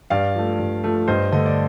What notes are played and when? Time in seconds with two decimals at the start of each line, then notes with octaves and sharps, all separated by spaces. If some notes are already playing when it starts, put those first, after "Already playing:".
0.10 G2 D5 F5
0.35 F3 A3
0.59 G2
0.84 F3 A3
1.08 G2 C5 D#5
1.32 D3 A3 D#5
1.46 D5